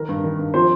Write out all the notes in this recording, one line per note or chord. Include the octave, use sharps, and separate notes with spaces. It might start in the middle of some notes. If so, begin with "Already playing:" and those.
Already playing: D#3 A#4
G2
D#3
G2
F3 C4 C5